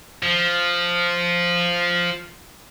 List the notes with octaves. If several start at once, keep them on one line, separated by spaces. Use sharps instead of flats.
F3